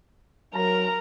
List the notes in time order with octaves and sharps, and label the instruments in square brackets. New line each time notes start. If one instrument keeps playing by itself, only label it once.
[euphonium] F#3 [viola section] A#4 [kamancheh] A#5